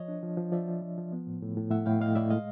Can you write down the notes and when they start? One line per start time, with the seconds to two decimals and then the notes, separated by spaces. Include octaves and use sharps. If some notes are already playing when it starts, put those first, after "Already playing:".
Already playing: F3 C#5 D#5
0.08 D4
0.23 F3
0.37 F3
0.52 F3 D5 E5
0.68 F3
0.82 F3
0.98 F3
1.12 B3
1.27 A2
1.42 A2
1.57 A2
1.71 A2 E5 F#5
1.86 A2 F5 G5
2.01 A2 D#5 F5
2.15 A2 D5 E5
2.30 G#3 D#5 F5